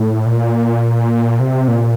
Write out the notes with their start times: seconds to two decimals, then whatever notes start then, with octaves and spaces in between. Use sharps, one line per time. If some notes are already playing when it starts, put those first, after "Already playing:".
Already playing: A2
0.26 A#2
1.40 C3
1.68 A#2